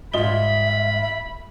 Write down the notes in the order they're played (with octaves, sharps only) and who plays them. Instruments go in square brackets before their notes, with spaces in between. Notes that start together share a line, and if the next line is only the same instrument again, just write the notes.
[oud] G#2 G3 [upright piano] F4 D#5 G7 [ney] E5 [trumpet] B5